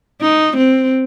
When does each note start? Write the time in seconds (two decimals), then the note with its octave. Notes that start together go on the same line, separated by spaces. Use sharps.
0.22 D#4
0.57 C4